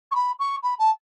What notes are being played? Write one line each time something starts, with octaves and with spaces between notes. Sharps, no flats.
C#6
B5
C#6
B5
A5